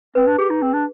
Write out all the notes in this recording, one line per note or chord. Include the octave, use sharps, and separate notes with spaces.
C4 B4
D4
G4 G#4
D#4
C4
D4